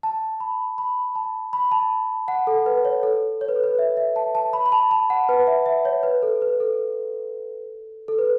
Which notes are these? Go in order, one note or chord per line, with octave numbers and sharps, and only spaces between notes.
A5
B5
B5
A5
B5
A5
F#5
A4
B4
C#5
A4
C#5
B4
A4
B4
E5
E5
A5
A5
B5
B5
A5
A5
F#5
B4
E5
E5
C#5
B4
A4
B4
A4
A4
B4